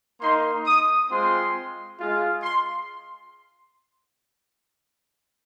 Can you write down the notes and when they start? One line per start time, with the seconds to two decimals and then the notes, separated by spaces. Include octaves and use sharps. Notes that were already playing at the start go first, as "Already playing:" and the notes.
0.20 A#3 D#4 C6
0.66 D#6
1.10 G#3 C4 F4 C6
1.98 G#3 F4
2.43 C6